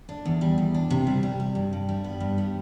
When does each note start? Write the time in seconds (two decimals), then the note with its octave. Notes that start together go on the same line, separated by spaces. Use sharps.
0.09 D4
0.25 E2
0.41 G3
0.58 E2
0.74 D4
0.90 C3
1.07 G3
1.23 G3
1.40 G3
1.55 G2
1.73 G2
1.89 G3
2.04 B3
2.20 G2
2.38 G3